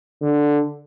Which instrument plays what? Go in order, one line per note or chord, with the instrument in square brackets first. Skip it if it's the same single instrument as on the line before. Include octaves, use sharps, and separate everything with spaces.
[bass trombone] D3